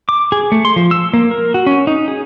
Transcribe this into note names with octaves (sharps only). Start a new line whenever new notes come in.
D6
G#4
A3
C6
F3
E6
A#3
A#4
F#4
C#4
D#4
G#4